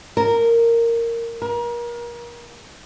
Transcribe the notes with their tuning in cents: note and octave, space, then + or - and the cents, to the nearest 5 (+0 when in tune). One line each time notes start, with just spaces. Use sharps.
A#4 -10
A#4 +35